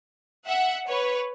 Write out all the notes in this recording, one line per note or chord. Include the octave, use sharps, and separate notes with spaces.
E5 F#5
B4 C#5